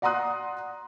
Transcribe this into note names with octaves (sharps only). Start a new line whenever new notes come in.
D5 F#5 A#5 C6 D#6 F#6